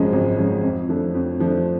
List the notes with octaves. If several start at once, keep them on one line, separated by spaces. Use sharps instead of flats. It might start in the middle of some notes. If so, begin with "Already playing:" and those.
Already playing: G#1 F#2 C#3 F3 G#3
G#1
F#2 C#3 F3 G#3
F2
F3 A3 D4
F2
F3 A3 D4